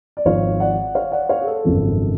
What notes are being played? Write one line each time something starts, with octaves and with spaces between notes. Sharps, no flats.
D5
G#1 G#2 F3 C#5 F5
D5 F#5
C#5 F5
D5 F#5
C#5 F5
G#4
A4
G#1 F#2 C#3 F3